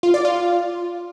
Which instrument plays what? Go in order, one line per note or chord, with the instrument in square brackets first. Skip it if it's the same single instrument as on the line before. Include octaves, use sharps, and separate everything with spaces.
[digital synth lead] F4
D5
F4